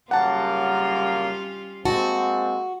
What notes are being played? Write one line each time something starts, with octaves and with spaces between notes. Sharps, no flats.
F#2 C#3 G3 A#3 C#4 F4 F#5 A5
G#3 A#3 C4 F#4 A5